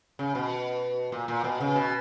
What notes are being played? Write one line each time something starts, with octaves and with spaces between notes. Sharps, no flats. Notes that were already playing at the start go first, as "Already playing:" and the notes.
C#3
B2
A#2
A#2
B2
C#3
B2